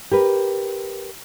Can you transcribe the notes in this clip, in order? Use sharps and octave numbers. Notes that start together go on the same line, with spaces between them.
G4 A#4 B4